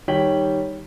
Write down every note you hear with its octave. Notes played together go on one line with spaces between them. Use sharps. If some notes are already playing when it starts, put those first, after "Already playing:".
D#3 G3 C#5 G5 B6 F#7